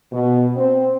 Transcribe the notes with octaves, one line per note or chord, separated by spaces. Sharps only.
B2
C4